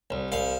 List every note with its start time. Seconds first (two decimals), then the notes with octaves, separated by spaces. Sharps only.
0.10 C2
0.32 C2 F5